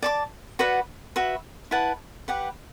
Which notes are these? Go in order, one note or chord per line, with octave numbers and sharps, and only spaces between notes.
D5 A5 D6
F#4 B4 D5 F#5
F#4 B4 E5
E4 B4 F#5 A5
G4 B4 F#5